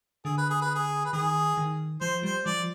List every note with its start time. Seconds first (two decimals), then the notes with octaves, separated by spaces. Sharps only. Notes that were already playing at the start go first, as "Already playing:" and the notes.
0.25 D3 G#4
0.38 B4
0.50 G#4
0.62 B4
0.75 G#4
1.05 B4
1.13 D#3 G#4
1.57 D#3
2.01 F3 C5
2.23 G3 C5
2.46 F3 D5